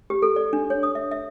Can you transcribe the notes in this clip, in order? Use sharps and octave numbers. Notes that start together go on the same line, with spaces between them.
G4
A4
D5
D4
C#5
D#6
E5
E5